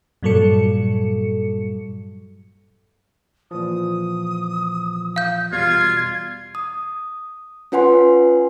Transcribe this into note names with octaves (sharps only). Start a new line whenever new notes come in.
G2 A#2 F#3 G3 A4 C#7
A#2 E3 F3 D#6
F5 G6
E2 B2 G3 F4 G#6
D#6
C#4 F4 B4 F#5 G#5 C6